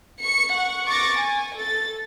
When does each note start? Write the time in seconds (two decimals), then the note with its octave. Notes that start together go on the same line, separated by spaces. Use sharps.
0.20 C#6 C#7
0.53 F#5 C#6
0.87 C#6 D6 A6 A#6
1.19 G#5
1.56 A4 A6